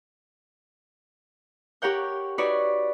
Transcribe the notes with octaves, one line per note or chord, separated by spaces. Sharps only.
G4 A#4 C#5 F#5 G6
D#4 F#4 B4 C#5 D5